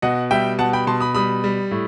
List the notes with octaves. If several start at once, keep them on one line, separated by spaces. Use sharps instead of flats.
B2 D#5 F#5
G3 E5 G5
B2 F#5 A5
G5 B5
B2 A5 C6
B5 D#6
G3 B5 D#6
G3
A2